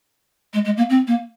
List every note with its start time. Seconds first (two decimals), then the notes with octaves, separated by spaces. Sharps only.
0.53 G#3
0.65 G#3
0.77 A#3
0.90 C4
1.07 A#3